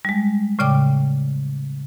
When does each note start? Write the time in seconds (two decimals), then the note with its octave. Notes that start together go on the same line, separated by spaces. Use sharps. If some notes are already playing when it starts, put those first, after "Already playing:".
0.05 G3 G#3
0.59 A2 C#3 D5 G5 D6